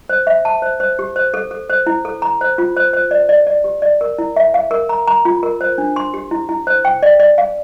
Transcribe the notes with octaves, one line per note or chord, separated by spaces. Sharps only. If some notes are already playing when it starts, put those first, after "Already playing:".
C5
E5
A5
C5
C5
G4
C5
A4
A4
C5
E4
A4
A#5
C5
F4
C5
C5
D5
D5
D5
G4
D5
A#4
E4
E5
F5
A#4
A#5
A#5
F4
A#4
C5
D4
C6
G4
E4
E4
C5
G5
D5
D5
F5